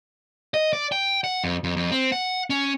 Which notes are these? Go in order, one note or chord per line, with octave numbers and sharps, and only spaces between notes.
D#5
D5
G5
F#5
F2
F2
F2
C4
F#5
C#4